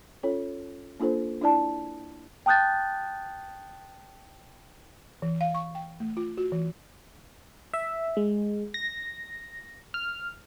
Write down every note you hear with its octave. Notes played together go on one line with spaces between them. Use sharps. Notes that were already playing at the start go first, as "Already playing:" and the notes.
C#4 F4 A4 C#5
A#3 D4 F4 A4 C5
D4 E4 D5 A5
G5 A5 D#6 F#6 G6 A6
E3
F5
C#6
G5
A3
F4
F#4
E3
E5
G#3
A#6
F6